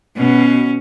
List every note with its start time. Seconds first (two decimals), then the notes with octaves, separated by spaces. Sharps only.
0.17 B2 C#4